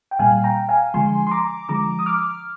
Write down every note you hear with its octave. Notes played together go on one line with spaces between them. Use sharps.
G5
A#2 G3 F5 G#5
G5 A#5
F5 G#5
D3 F3 G#3 G#5 C6
C6
A#5 D6
D3 F3 G#3 A#5 D6
D#6
D6 F6